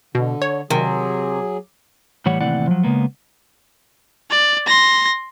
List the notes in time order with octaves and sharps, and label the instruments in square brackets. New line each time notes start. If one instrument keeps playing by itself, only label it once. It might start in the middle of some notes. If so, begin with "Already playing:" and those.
[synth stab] B2 [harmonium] D3
[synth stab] C#5
[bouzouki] C3 [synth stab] D#3 [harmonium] F#3 G#4
[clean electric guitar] A2 E3 G3 C#5 F#5
D#2 A2 C3 E3 D5 F#5
F3 F#3
C#3 G#3 A#3 B3
[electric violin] D5
C6 A#6